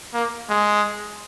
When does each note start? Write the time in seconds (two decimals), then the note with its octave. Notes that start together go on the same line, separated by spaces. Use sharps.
0.14 A#3
0.50 G#3